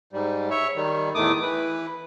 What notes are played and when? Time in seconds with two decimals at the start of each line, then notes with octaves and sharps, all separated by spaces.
0.13 G#2 G3
0.50 C#5 E5
0.76 D#3 G3
1.15 E2 A2 D#3 A3 D6 D#6
1.42 E3 B4